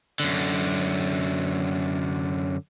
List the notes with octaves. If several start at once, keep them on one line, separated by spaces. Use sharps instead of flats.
F#2 D3